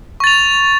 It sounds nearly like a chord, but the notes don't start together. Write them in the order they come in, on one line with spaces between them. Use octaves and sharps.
C#6 A6 F7